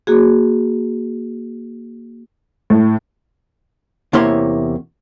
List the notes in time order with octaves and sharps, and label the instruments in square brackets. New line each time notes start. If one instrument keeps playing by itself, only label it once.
[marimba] A#3 F#4 G#4
[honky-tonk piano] A2
[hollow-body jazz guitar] E2 C3 A#3 E4 C#5 C6